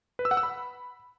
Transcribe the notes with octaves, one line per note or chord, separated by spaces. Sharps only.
B4
E6
F#5
E6
B5